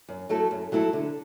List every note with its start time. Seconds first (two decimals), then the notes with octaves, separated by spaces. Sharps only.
0.09 F#2
0.29 F#3 A3 E4 A4
0.51 F#2
0.72 F#3 A3 E4 A4
0.93 D3